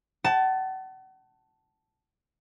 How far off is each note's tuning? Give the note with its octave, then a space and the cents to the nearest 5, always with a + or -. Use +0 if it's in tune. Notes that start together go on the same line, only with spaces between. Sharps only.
F#5 +40 A5 +0